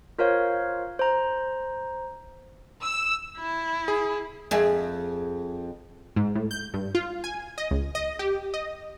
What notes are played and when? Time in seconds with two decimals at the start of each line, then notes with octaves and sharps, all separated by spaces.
0.18 F4 A#4 C5 C#5 F5
0.99 C5 A#5
2.83 E6
3.38 E4
3.88 G#4
4.51 F2 G#4 E5
6.16 G#2
6.35 A2
6.51 G6
6.74 G2
6.95 F4
7.24 G#5
7.58 D#5
7.71 C#2
7.95 D#5
8.19 G4
8.54 D#5